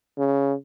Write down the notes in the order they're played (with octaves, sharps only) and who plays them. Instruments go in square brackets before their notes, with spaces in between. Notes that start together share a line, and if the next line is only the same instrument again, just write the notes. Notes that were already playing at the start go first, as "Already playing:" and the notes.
[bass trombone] C#3